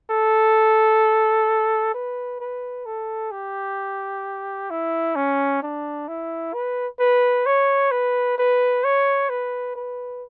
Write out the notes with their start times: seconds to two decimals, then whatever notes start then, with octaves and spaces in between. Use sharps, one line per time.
0.10 A4
1.94 B4
2.40 B4
2.86 A4
3.31 G4
4.70 E4
5.16 C#4
5.62 D4
6.08 E4
6.53 B4
7.00 B4
7.46 C#5
7.91 B4
8.38 B4
8.84 C#5
9.29 B4
9.75 B4